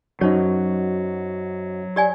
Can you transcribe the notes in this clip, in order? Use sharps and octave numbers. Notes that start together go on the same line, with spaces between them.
F#2 F#3 D#4 F#4 C5 C#5 D#5
G4 D5 G#5